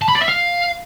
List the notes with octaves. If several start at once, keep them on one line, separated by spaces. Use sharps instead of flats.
A5
B5
D5
E5
F5